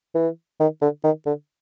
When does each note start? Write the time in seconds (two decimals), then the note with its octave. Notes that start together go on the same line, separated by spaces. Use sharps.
0.15 E3
0.60 D#3
0.81 D3
1.04 D#3
1.26 D3